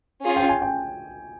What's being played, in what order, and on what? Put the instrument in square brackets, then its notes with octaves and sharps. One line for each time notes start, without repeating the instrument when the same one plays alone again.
[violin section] C#4 F4 G#4
[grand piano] G5
G#5
G5